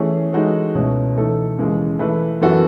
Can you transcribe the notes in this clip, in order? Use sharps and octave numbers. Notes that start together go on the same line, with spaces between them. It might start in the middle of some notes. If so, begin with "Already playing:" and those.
Already playing: E3 A3 C#4 G#4
E3 G#3 D#4 F#4 A4
C#2 B2 A3 C#4 E4
E3 A3 D#4 A4
D#2 C#3 E3 G#3
E3 A3 E4 B4
F#2 E3 B3 F#4 A4